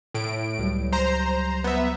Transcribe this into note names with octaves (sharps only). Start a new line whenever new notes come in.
A2 D7
C#2 F#3 G3
C5 A#5
B3 E5